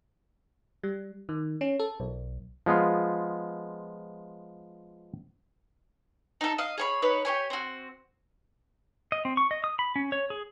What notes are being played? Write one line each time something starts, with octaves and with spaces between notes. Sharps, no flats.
G3
D#3
C#4
A4
B1
F3 G#3 B3 F4
D#4 A4
D#5 F5
G#4 C#5 B5
D#4 B4 C#5
G4 C#5 G#5
C4 F#4
D#5
C4
C#6
D#5
D#6
B5
C#4
C#5
G#4